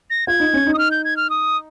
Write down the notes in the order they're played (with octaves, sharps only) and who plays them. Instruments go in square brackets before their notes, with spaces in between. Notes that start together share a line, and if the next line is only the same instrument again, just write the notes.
[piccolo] A#6
[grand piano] F4 [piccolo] G#6
[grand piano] D#4
C#4
D#4
[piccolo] D#6
F6
G6
G#6
F6
D#6